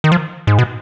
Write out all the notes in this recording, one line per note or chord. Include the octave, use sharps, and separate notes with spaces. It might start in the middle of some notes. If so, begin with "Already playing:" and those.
D#3
F3
G#2
B2